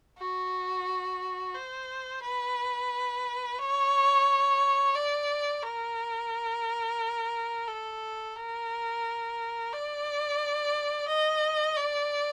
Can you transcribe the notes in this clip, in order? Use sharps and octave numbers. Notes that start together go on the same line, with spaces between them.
F#4
C5
B4
C#5
D5
A#4
A4
A#4
D5
D#5
D5